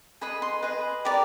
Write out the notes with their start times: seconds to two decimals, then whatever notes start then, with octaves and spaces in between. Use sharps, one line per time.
0.21 G#4 B4 D#5 B5
0.42 C6
0.62 G#4 B4 D#5
1.05 G4 A#4 D5